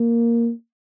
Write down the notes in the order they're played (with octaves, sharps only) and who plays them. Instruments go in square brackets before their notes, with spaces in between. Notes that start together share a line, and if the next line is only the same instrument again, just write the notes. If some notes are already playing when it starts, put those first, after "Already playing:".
Already playing: [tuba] A#3